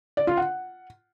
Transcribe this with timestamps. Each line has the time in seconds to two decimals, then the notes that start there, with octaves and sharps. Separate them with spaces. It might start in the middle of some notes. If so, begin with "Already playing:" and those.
0.17 D5
0.27 F4
0.37 F#5